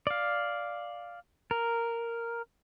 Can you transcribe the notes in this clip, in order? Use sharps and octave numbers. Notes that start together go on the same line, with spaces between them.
D5 F5
A#4